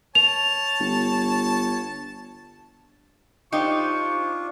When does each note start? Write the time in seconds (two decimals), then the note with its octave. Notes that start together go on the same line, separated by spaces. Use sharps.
0.15 C#5 A5 F7
0.80 G1
3.53 D4 D#4 F4 G4 C5 C#6